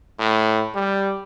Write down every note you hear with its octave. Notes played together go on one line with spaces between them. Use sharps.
A2
G3